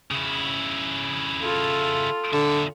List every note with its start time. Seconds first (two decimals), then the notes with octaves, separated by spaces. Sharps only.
0.11 C#3 E4
1.40 F4 A4
2.33 A#2 D3 E5